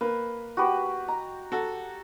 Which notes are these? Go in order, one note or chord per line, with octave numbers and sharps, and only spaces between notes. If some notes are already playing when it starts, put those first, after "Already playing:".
A#3 B4
F#4 G4 B4
A#5
F#4 A4